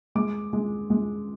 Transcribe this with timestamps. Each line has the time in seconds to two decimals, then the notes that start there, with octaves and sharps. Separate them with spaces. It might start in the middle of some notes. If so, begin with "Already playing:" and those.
0.15 G#3 D6
0.53 G#3
0.90 G#3